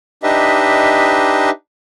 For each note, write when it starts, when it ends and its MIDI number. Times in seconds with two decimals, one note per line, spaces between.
0.23 1.50 62
0.23 1.50 63
0.23 1.50 67
0.23 1.50 71
0.23 1.50 75
0.23 1.50 76